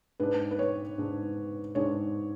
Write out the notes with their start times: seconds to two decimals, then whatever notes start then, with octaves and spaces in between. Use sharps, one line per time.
0.20 G#2 G#3 D4 B4
0.51 B4
0.59 C#5
0.98 G#2 G#3 D4
1.75 G#2 G#3 D4 C#5